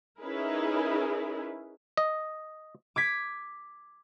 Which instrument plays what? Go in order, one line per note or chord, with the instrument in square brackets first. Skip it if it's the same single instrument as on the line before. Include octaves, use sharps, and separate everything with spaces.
[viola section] C#4 D#4 E4 G#4 A#4 B4
[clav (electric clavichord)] D#5
[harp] D6 G#6 B6